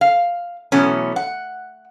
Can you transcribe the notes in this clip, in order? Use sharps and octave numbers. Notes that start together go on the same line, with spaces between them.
F5
B2 E3 F#3 A3 B3 C#4
F#5